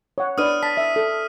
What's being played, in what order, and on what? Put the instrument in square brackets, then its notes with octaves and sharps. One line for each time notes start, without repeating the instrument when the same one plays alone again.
[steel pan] C#5 F#5
[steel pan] D4 B4 D5 [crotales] D#6 F6 D#7
[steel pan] A5 [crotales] B6
[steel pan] E5
A4